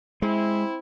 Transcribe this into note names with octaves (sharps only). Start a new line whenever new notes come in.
G#3 C4 E4